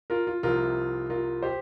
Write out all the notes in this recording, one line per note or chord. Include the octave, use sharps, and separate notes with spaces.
F4 A#4
F4
C2 C3 F3 F4 A#4
F4 A#4
G4 C5